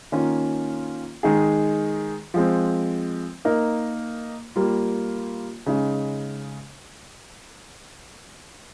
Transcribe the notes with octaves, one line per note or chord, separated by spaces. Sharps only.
D#3 A#3 C#4 F4
D#3 G#3 D#4 G#4
F3 G#3 C4
A#3 D#4 A#4
G3 A#3 F4
C#3 G#3 D#4